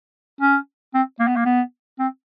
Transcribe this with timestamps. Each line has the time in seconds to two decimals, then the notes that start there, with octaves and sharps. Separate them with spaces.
0.41 C#4
0.94 C4
1.20 A#3
1.27 B3
1.36 A#3
1.45 B3
1.99 C4